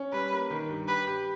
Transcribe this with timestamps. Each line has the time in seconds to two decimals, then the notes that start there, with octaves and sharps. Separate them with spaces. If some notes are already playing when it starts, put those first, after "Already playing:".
Already playing: C#4
0.12 G3 B4
0.32 A#3
0.50 D#3
0.69 G2
0.88 G4 B4
1.07 G4